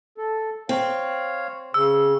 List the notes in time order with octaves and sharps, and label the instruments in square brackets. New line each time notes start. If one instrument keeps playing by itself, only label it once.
[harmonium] A4
[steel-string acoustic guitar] C4 [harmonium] C#5 F5
[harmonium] C#3 [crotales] E6